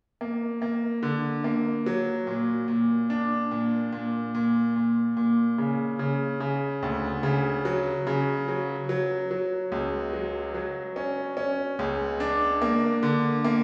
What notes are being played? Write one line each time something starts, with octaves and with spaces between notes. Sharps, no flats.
A#3
A#3
D3
A#3
F#3
A#2
A#2
D4
A#2
A#2
A#2
A#2
A#2
C#3
C#3
C#3
D2
C#3
F#3
C#3
F#3
F#3
F#3
C#2
F#3
F#3
C#4
C#4
C#2
D4
A#3
D3
A#3